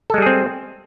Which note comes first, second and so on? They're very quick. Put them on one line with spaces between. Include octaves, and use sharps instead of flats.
A4 G#3 G3 G#4 C4